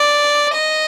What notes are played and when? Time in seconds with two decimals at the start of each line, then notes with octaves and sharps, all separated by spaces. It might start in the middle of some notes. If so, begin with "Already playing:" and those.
Already playing: D5
0.54 D#5